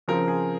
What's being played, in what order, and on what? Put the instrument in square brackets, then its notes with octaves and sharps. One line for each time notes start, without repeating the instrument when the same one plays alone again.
[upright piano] C#3 F3 C4 [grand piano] A#4
[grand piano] G#4